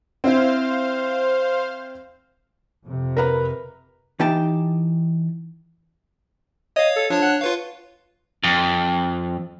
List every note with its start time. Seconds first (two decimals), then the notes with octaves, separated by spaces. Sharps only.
0.24 C4 E4 C5 F5
2.84 F2 C3
3.17 A#4 B4 A#5
4.20 E3 D#4 G4 G5 A5
6.76 C#5 D#5 F5
6.96 A4
7.10 F3 D4 C#5 A5
7.22 F#5
7.41 F4 B4 C#5 F5
8.43 F2